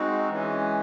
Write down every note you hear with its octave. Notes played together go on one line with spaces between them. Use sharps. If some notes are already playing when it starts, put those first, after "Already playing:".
Already playing: G#3 C4 D#4 F#4
E3 G#3 C#4